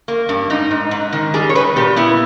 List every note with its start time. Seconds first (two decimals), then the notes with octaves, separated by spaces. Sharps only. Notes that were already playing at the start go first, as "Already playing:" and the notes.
0.08 A#3
0.29 G2
0.50 G#2 D#4
0.71 G#2
0.91 G#2
1.12 D#3
1.34 G3 G#4
1.49 C#5
1.55 G3 B4
1.76 A#2 G4
1.96 B3 E4